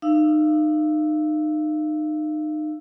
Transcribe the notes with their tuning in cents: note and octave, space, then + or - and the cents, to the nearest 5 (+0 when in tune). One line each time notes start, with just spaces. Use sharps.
D#4 -30 F5 -30 E6 +0